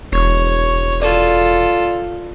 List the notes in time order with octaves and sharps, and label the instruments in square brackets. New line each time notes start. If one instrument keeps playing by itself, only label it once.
[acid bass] E1 [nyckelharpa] C#5
[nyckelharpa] F4 A4 [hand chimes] D5